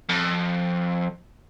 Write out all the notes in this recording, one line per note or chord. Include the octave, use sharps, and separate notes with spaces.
F2